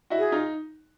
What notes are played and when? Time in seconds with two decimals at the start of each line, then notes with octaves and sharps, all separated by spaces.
0.10 E4 F#4
0.18 G#4
0.32 D#4 F4